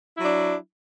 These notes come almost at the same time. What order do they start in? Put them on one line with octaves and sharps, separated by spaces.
E4 F#3 D4